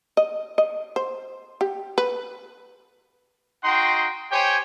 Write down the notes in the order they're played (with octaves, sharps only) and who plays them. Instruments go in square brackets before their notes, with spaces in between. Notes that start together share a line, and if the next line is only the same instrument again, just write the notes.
[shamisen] D#5
D#5
C5
G4
B4
[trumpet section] D#4 F#4 G5 C6
G4 C5 C#5 G5 G#5